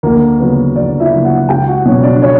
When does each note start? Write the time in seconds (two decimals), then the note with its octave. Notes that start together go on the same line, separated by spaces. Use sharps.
0.03 D2 A#3 A#4
0.40 C#3 F#3 A#3 B3 B4
0.76 D2 D4 D5
1.00 E4 E5
1.13 C#3 F#3 A#3
1.25 F#4 F#5
1.49 C#2 G4 G5
1.68 F#4 F#5
1.85 B2 F#3 C#4
2.03 D4 D5
2.22 C#4 C#5